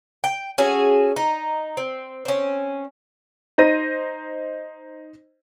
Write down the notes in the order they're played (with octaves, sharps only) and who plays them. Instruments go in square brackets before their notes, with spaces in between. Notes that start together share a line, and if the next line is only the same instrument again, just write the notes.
[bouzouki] G5
C#4 F#4 G#4 A4
D#4
C4
C4 C#4
[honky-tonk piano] D#4 C5 A#6 D#7